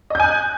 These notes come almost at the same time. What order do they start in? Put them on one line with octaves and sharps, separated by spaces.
D#5 G6 G#5 F#6